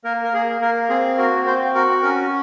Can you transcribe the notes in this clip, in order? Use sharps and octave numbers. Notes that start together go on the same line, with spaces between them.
A#3 A#4
A#4
A#3 G#4
A#3 A#4
C4 G#4
F#4 A#4
C4 C5
F#4 A#4
C#4 A#4